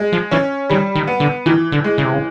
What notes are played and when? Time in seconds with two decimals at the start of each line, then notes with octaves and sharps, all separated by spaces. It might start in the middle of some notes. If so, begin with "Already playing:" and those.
Already playing: G#3
0.12 F3
0.31 E3 C#4
0.70 D#3 G3
0.95 D#3
1.07 B3
1.20 D3
1.46 D#3 E3
1.72 D3
1.84 G#3
1.98 C#3
2.05 C3
2.14 C#3